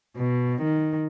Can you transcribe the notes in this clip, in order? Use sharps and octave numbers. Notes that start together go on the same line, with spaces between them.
B2
D#3